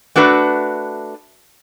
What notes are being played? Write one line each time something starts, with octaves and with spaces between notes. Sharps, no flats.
A3 D4 F#4 B4 E5